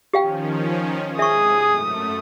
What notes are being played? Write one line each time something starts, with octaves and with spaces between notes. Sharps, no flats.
D#3 F3 C#4 G4 F5 G5
G#2 C3 G#4 E5 C#6 D#6
F#2 A3